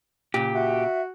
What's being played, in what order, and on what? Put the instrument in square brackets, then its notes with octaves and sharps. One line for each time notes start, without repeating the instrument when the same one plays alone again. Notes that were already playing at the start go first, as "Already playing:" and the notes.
[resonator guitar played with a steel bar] A#2 C#3 [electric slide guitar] G4
[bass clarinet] F#4 [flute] E5